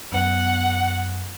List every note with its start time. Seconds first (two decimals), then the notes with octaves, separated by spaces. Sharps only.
0.12 F#2 B3 F#5